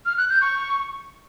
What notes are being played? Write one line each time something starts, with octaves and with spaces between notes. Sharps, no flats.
F6
F#6
G6
C#6